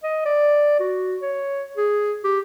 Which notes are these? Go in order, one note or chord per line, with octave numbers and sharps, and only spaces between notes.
D#5
D5
F#4
C#5
G#4
G4